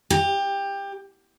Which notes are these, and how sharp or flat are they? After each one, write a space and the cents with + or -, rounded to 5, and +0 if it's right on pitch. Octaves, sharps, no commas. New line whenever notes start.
G4 +20